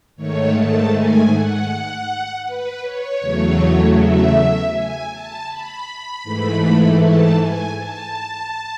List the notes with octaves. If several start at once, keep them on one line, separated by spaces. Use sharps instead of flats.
G#2 D#3 A3 C#5
A5
G#5
F#5
B4
C#5
E2 C#3 F#3 A3
E5
G#5
A5
B5
G#2 E3 A3
A5
G#5
A5